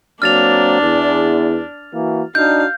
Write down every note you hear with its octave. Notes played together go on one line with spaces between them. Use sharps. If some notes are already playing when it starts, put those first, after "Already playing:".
F#3 A#3 C4 D4 F6 A6 F7
E2
E3 A#3 F#4
D4 D#4 F#4 F5 G6